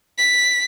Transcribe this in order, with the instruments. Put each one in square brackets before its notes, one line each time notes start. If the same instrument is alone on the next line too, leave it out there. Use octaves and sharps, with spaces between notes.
[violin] B6